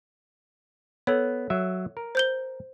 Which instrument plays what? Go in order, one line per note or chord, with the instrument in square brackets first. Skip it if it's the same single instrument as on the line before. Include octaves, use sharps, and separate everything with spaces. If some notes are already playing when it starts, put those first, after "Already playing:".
[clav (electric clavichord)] B3 [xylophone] A4 C#5
[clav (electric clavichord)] F#3 E5
A#4
[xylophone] C5 G6 G7